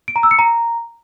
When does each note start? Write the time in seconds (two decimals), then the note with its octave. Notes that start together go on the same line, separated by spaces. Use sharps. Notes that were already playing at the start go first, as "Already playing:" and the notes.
0.08 D7
0.16 A#5
0.23 E6
0.31 C#7
0.39 A#5